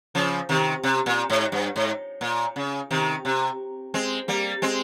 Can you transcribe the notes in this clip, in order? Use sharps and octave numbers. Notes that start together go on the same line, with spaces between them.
C#3 F3
C3 D#3
C3
A#2
G#2
G2
G#2
A#2
C#3
C3 D#3
C3
G#3 C4
G3 A#3
G#3 C4